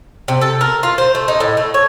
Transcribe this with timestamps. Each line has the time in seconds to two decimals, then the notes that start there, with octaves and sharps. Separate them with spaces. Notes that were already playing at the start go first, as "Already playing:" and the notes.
0.28 C3
0.41 A4
0.61 A#4
0.83 F4
0.98 C5
1.15 A3
1.28 D#4
1.40 A2
1.57 A3
1.74 C#5